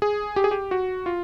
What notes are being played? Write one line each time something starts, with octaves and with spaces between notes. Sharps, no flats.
G#4
G4
G#4
G4
F#4
F4